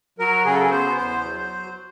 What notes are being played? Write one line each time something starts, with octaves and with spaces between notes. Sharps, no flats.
F#3 A#4
C#3 G#4
A4
G#4
B3 C5
E2 C5
F#3